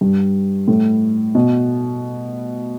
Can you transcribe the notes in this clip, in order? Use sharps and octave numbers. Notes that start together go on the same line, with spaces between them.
G2
A2
B2